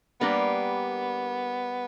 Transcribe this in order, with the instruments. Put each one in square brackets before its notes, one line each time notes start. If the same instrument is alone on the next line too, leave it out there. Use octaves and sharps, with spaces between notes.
[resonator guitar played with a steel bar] G3 A#3 D4 G4 A#4 [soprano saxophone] B3